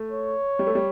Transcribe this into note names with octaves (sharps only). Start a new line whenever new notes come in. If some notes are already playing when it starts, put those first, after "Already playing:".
Already playing: A3
C#5
G3
A3
G3